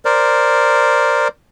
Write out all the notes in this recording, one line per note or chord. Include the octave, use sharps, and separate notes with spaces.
A#4 C5 D5